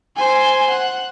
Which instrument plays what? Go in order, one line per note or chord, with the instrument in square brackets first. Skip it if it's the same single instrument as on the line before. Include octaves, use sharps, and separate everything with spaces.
[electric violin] C5 G#5
F#5